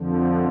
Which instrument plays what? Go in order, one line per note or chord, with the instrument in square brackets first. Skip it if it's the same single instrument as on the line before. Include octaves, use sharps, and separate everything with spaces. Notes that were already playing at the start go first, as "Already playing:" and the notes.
Already playing: [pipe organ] F2 D3 F3